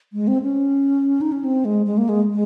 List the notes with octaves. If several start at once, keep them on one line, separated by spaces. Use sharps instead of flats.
G#3
C4
C#4
D#4
C#4
C4
G#3
G#3
A#3
G#3
G#3